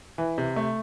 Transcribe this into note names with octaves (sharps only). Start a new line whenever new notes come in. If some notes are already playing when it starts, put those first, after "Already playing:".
E3
C3
A3